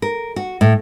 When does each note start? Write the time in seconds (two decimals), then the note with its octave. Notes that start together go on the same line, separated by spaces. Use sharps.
0.02 A#4
0.36 F#4
0.61 A2